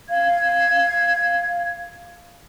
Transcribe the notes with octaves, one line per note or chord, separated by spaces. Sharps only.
F5 G#6